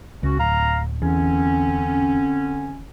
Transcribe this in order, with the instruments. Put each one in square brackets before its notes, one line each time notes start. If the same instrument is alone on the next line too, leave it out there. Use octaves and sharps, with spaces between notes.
[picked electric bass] C#2 [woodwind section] C#4 F#4
[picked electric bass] D1 [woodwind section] F5 A#5
[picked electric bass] E2 [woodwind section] D3 C4 C#4